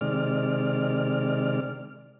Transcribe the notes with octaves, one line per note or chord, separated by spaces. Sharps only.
C3 D#3 G#3 D5 F6